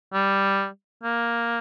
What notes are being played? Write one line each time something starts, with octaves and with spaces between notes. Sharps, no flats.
G3
A#3